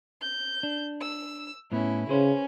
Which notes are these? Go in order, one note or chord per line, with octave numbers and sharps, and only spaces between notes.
G6
D4
E6
A2 B3 C#4 E4
C#3 C#4 G#4 B4 C5